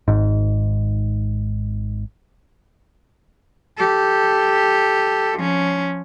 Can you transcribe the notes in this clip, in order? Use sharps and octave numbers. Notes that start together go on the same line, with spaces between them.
G#1 G#2
G4 A4
F3 C#4